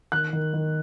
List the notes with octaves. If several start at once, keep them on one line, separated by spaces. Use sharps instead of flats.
D#3 F#6
D#3
D#3